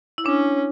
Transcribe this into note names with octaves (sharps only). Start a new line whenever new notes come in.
E4
C#4 D4